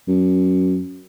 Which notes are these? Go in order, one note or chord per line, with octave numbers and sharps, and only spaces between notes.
F#2